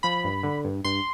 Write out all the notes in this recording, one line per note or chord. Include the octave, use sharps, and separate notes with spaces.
F3 B5
G2
D3
G2
G2 C6